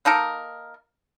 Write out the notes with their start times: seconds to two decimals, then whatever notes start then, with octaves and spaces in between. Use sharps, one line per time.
0.05 A#3 D#4 A4 A#4